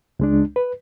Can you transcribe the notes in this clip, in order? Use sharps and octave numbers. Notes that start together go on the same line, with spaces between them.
C#2 G#3 D4
B4